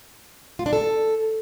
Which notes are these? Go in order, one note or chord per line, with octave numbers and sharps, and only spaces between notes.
F4
D4
A4